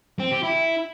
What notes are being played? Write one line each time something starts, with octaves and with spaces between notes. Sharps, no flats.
C4
G4
E4